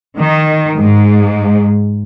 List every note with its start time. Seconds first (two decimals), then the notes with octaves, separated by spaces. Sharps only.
0.17 D#3
0.77 G#2